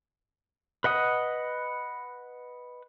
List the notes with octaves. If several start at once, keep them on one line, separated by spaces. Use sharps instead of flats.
B4 D#5 F#5 D#6